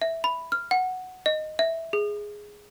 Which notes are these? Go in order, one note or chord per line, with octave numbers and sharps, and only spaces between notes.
E5
B5
F6
F#5
D#5
E5
G#4